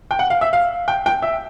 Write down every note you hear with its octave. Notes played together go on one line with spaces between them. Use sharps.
G5
F#5
F5
E5
F5
G5
G5
E5